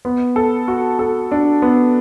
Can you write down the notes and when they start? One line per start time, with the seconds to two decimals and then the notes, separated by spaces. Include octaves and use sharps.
0.05 B3
0.36 A4
0.68 F#4
0.99 A4
1.32 D4
1.62 B3